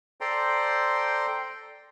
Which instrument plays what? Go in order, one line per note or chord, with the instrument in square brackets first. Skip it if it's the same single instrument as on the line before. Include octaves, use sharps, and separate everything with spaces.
[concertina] A4 C5 D5 G5 A#5 C6